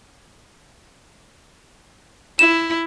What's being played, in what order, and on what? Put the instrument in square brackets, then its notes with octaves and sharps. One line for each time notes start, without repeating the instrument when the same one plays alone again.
[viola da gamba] E4 [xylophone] E7